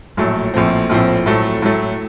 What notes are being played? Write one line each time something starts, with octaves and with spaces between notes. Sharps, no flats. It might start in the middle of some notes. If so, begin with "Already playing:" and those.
A#1 A2 F#3 A3
A#1 A2 F3 C4
A#1 A2 F3 C4
A2 F#3 A3
A2 F#3 A3